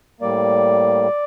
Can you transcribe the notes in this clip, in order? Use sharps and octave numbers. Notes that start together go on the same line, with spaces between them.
A2 G3 A#3 D5